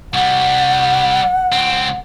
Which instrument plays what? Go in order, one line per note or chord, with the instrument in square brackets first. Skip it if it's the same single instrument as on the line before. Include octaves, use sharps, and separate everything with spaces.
[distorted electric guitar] C2 G3 [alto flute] F#5
[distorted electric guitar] C#2 C4